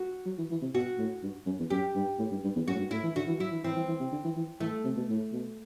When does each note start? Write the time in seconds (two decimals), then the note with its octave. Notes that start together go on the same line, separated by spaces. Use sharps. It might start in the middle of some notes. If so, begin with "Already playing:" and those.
Already playing: F#4
0.25 F#3
0.38 E3
0.51 E3
0.62 C3
0.75 B2 F#4
0.98 A2
1.23 G2
1.46 F#2
1.59 E2
1.70 F#2 G4
1.95 G2
2.19 A2
2.31 G2
2.44 G2
2.55 E2
2.68 F#2 F#4
2.75 A2
2.79 G2
2.91 A2 E4
3.03 E3
3.16 D3 F#4
3.27 E3
3.40 F#3 E4
3.51 E3
3.64 E3 C4
3.76 E3
3.88 E3
4.00 C3
4.12 D3
4.24 E3
4.37 E3
4.60 E3 A3
4.85 C3
4.96 B2
5.09 A2
5.32 B2